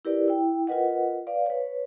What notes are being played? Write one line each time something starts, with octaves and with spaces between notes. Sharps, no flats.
E4 G4 A#4 B4 D5
E4 G5
F4 A#4 B4 D#5 F#5
B4 D5 F5
B4 C#5